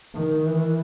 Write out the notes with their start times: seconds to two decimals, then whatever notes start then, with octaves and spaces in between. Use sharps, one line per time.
0.15 D#3
0.46 E3